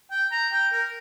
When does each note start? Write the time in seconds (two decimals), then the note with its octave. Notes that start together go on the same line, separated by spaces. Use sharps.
0.11 G5
0.32 A#5
0.52 G5
0.72 A#4